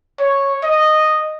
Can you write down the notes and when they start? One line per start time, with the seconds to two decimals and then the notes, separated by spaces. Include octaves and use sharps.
0.19 C#5
0.63 D#5